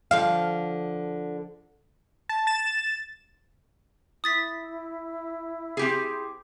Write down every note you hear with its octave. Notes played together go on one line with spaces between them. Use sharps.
D3 F3 F5
A5
A6 E7
E4 D#6 A6 B6
C4 G4 G#4